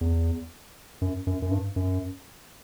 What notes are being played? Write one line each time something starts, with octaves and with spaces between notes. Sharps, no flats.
E2
F#2
F#2
F#2
G2
F#2